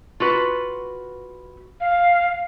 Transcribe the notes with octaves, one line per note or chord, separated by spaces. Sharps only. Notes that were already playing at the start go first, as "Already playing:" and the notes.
F4 F#4 B4
F5